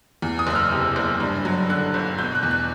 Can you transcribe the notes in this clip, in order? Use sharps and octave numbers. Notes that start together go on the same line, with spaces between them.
E2
D#6
F#1 E6
F6
C3
F#1
G2
F#3
D3 F#6
G1
B2 G6
F#6
E2
F#6